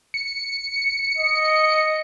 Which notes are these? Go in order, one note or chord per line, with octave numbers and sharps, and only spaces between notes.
C#7
D#5